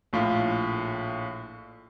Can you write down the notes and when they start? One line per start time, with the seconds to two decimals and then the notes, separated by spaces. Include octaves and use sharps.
0.13 A#1 A2 F4 F5